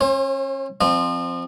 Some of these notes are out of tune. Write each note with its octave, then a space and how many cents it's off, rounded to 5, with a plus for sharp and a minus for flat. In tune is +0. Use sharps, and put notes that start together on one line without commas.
C#4 -35 C5 +35
F3 +5 C4 +0 D#5 -40